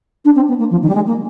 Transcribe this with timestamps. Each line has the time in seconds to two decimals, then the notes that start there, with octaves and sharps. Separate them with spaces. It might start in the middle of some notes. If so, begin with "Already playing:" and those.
0.25 D4
0.35 C4
0.48 B3
0.59 A#3
0.71 F3
0.82 D#3
0.88 G3
0.95 G#3
1.07 A#3